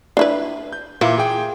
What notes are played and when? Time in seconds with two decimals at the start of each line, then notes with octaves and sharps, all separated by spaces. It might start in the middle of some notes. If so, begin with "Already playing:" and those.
0.17 D4 E4 B4
0.73 G6
1.01 A#2 E3 A#3 E4
1.18 G#4 G5